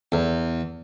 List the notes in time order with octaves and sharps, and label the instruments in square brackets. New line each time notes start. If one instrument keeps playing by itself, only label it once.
[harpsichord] E2